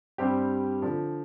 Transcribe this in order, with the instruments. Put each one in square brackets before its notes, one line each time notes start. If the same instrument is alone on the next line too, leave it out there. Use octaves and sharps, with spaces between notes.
[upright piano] G2 G3 C4 G4
D3 F3 D4